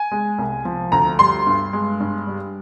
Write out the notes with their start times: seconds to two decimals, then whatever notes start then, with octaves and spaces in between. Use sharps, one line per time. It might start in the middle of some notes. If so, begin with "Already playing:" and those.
Already playing: G#5
0.12 G#3
0.38 C2
0.65 F3
0.92 D2 A#5
1.19 G3 C6
1.47 G2
1.73 G#3
2.00 G2
2.27 G3